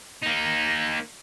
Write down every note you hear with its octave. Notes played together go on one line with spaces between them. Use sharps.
A#3 D#4